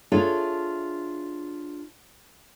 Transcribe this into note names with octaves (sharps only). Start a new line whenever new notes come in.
D4 F4 G#4 A4 C#5 E5